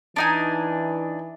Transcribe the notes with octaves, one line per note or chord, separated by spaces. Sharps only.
E3 D4 D#4 G#5